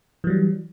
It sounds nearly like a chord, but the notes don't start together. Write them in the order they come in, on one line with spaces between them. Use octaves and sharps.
E3 F#3 G3